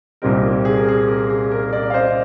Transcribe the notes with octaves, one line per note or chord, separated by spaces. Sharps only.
C2 A#2 G3 C4 D#4 A#4
G#4
A#4
G#4
A#4
G#4
A#4
A#4 D5
F5
C5 D#5